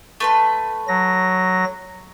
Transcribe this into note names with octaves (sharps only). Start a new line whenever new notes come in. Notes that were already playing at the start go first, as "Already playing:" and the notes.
A3 B4 C6
F#3 A#6